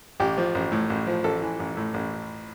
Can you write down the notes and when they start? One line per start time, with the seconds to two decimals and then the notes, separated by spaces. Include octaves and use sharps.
0.20 A1 G4
0.37 F3
0.55 A1
0.72 A2
0.90 A1
1.07 F3
1.24 A1 A4
1.42 E3
1.60 A1
1.77 A2
1.94 A1